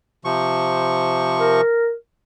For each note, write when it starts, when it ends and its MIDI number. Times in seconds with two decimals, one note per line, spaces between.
0.25 1.61 48
0.25 1.61 53
0.25 1.61 85
1.40 1.92 70